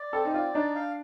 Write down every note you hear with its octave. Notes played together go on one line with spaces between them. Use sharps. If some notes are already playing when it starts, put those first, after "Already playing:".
Already playing: D5
C4 A4
D#4
F4 D5
D4 D#4
F5